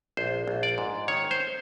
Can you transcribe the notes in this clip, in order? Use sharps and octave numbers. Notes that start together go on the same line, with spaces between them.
A#1 C5
A#1
D5
G#2
D#3 C#5
C5